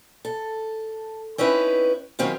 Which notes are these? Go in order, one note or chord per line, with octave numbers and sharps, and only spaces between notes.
A4
C4 C#4 D#4 E4 B4
D#3 F#3 C4 C#4 E4 F4